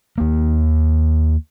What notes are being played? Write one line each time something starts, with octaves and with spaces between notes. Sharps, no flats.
D#2 A#3